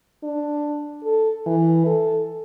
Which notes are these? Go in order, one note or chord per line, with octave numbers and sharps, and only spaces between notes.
D4
A4
E3
A4